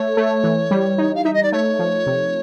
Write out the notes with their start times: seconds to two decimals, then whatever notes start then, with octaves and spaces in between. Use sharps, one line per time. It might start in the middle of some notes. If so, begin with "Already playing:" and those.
Already playing: A3 C#5
0.17 A3
0.44 E3
0.71 G3
0.98 D#4
1.15 F5
1.24 D#4 E5
1.34 D#5
1.43 D5
1.52 A3 C#5
1.79 F3
2.07 C3